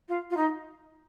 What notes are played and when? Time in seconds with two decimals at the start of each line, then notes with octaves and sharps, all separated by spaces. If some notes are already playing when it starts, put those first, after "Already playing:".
0.08 F4
0.30 F4
0.36 D#4